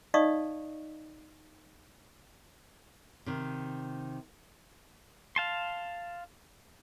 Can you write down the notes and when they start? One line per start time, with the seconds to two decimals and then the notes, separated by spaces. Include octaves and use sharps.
0.14 D#4 D5 D#5 F5 C#6 D#6
3.26 C3 D#3
5.36 F5 A5 C6